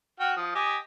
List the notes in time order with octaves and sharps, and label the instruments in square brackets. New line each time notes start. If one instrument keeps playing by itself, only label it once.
[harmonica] F#4 G5 F6
F3 D#6
G4 D#5 G#5